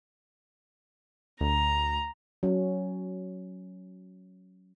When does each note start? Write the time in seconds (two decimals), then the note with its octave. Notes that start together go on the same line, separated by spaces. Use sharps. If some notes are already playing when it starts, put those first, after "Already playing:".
1.41 D2 A#5
2.43 F#3 C#4